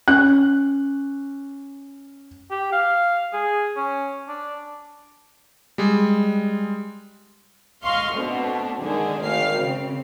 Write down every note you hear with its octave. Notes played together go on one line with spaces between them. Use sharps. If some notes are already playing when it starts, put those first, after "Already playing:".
C#4 F#6
G4
F5
G#4
C#4
D4
G3 G#3
D#5 F5 C6 C#6
B2 A3 C4 D4
D3 D#3 G#3 A#3 G#4
G#1 D2 D#3 F5 G5 C7
C#3 C4